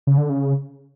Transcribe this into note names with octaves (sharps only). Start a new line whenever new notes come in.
C#3
D3
C#3